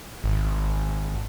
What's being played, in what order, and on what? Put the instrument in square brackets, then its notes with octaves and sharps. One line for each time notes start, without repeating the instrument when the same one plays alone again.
[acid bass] G#1